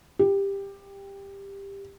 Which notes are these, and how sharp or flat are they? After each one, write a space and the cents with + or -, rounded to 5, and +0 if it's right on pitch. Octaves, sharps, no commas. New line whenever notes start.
G4 +15